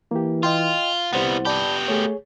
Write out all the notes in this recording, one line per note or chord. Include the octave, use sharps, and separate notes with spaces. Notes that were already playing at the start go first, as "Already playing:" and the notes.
E3 A#3 G4
F4 D#5 G5 C6
C2 G3 B3 E4 C5 F#5
B3 G4 D5 A5 B5
A3 G#4 C#5